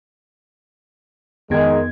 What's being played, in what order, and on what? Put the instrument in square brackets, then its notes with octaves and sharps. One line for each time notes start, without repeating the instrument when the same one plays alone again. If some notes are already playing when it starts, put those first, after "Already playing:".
[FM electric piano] F2 B3 G#6 [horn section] D#3 G#3